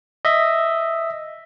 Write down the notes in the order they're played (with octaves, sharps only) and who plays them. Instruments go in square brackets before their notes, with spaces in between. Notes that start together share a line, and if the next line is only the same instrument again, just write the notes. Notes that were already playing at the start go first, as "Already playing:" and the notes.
[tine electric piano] D#5 E5